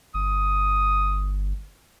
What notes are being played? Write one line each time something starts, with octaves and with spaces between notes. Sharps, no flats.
G1 D#6